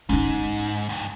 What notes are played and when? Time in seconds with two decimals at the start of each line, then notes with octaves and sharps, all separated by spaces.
0.09 G#2 C#4 D#4
0.89 D2 G2